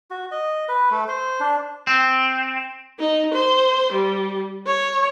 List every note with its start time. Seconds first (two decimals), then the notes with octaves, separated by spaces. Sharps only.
0.11 F#4
0.31 D#5
0.69 B4
0.91 A3
1.08 C5
1.40 D4
1.87 C4
2.99 D#4
3.34 C5
3.93 G3
4.66 C#5